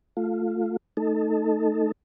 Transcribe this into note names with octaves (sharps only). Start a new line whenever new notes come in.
A3 F4
A3 D#4 A4